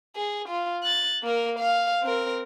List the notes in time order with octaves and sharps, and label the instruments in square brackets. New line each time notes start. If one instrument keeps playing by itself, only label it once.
[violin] G#4
F4
F#6 A6
A#3 A#4
F5
C4 A#4